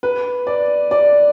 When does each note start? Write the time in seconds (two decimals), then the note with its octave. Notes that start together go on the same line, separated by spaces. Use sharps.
0.03 B4
0.47 D5
0.91 D5